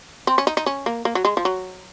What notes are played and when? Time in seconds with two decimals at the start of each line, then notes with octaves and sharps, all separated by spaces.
0.27 C4
0.38 C#4
0.47 D#4
0.57 D#4
0.66 C#4
0.86 A#3
1.05 A#3
1.15 F#3
1.25 G#3
1.37 F3
1.45 F#3